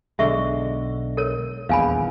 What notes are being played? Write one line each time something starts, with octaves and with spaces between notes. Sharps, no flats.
B1 D3 G#3 E5 C#6
A4 A#4 C#5
D#1 A#1 E2 F5 G#5 B5